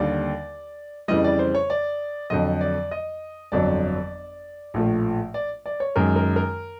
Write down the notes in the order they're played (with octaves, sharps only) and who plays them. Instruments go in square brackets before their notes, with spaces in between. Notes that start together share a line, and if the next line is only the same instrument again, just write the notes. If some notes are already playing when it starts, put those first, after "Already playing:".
Already playing: [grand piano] D#2 D3 G3 D5
F2 C#3 E3 G3 D#5
D5
C5
C#5
D5
F2 D3 F#3 D#5
D5
D#5
G1 F2 D3 F#3 D5
A#1 A2 F3 A3
D5
D5
C#5
F#2 D#3 G#3 A#4
A#4
A#4